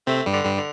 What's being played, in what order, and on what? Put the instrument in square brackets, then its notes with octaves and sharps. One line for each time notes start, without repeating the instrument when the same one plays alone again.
[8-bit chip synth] C3 C4 [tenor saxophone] A3
[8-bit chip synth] G2 G3
[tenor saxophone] D3
[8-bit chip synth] G2 G3
[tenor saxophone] D3